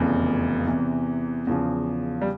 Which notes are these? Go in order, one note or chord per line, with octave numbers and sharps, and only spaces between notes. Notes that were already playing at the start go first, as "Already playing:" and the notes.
Already playing: F1 E2 C#3 F3
E2 C3 E3
E2 C#3 F3
G3